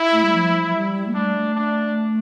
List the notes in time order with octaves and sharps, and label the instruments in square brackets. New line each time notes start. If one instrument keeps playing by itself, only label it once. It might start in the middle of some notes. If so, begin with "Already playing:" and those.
Already playing: [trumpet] E4
[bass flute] A3
G3
F3
F3
G3
A#3
[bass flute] A3 [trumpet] D4
[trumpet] D4